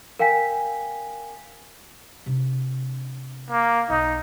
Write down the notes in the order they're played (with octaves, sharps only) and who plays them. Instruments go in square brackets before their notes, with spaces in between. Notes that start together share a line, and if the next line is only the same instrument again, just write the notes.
[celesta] A#4 F5 G5 G#5 B6
[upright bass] C3 D4
[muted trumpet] A#3
[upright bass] B1 [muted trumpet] D#4